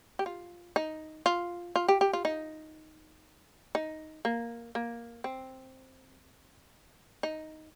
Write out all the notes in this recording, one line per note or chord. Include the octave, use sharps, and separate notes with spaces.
G4
F4
D#4
F4
F4
G4
G4
F4
D#4
D#4
A#3
A#3
C4
D#4